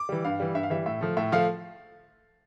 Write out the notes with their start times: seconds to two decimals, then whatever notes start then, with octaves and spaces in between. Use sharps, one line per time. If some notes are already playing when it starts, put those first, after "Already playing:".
Already playing: D6
0.09 E3 G3
0.25 G2 F5
0.40 E3 G3
0.55 G2 E5
0.63 F5
0.70 E3 G3 E5
0.86 A2 E5
1.01 F3 A3
1.17 A2 E5
1.32 F3 A3 F5